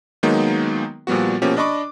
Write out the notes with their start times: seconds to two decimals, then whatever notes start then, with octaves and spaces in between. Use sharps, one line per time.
0.23 D#3 F#3 G#3 A#3 B3 D#4
1.07 A#2 F3 G3 B3 F#4
1.42 B2 F3 A#3 C#4 G4
1.57 D4 D5 D#5 B5 C#6 D6